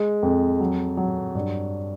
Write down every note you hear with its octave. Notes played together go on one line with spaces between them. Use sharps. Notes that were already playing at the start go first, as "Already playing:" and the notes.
Already playing: G#3
F2
F#3
F#3
G2